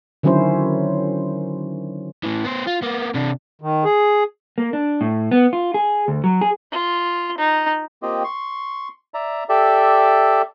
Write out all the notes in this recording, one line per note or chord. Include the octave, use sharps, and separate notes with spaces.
D3 D#3 F#3 C#4 E4 C5
A2 E3
B3 C5
F4
A#3 B3
C3 D4
D#3
G#4
A#3
D4
A2
B3
F4
G#4
D2
F#3
G#4
F4
D#4
A#3 C4 F4 G4 D#5
C6 C#6
D5 E5 A#5
G4 A4 D5 E5